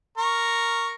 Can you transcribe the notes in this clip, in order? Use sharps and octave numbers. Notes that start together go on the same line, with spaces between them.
A#4 C#6